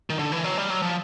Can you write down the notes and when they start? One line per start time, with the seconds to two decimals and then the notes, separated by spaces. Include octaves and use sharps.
0.10 D#3
0.19 D3
0.32 E3
0.44 F#3
0.57 G3
0.70 F#3
0.82 F3